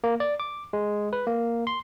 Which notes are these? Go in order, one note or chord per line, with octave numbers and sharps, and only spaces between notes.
A#3
D5
D6
G#3
B4
A#3
C6